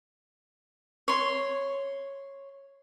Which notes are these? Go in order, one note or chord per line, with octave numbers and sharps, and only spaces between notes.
C#5 C6